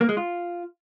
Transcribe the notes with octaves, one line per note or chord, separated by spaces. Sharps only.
A#3
G#3
F4